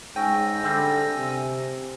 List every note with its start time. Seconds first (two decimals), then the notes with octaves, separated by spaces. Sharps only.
0.16 G#2 C#4 G5 G#5 E6 A#6
0.64 D3 G3 C4 E5
1.16 C3